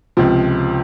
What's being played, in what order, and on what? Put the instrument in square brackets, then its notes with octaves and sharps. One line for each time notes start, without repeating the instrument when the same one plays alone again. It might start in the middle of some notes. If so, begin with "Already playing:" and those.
[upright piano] C#2 C3 F3